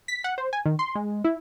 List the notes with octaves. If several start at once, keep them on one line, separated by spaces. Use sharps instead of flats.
B6
F#5
C5
G#5
D#3
C6
G#3
E4